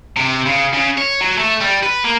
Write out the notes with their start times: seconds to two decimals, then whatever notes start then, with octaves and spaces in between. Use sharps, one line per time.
0.17 C3
0.46 C#3
0.74 C#3
0.98 C#5
1.21 F#3
1.37 A3
1.61 G3
1.83 B4
2.04 A#3